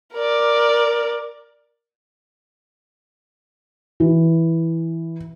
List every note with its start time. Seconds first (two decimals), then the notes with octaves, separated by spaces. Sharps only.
0.14 A#4 D5
4.00 E3